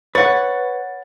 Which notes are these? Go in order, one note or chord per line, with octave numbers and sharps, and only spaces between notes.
B4 C#5 F#5 A6